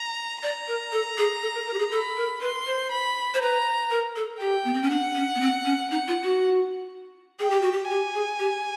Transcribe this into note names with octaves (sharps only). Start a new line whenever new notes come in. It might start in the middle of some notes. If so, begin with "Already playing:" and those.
Already playing: A#5
D5 A#5
A#4
A4
G#4
A4
A#4
A#4
G4
G#4
A4 B5
A#4
B4 C6
C5
B5
C5
B4 A#5
A#4
A4
G4 G5
B3
C4
C#4
D4 F#5
C#4
B3
C4
C#4
D#4 F#5
F4
F#4
G#4 G5
G4
F#4
G4
G4 G#5
G#4
G4